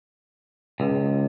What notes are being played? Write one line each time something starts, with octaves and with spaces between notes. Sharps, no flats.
C#2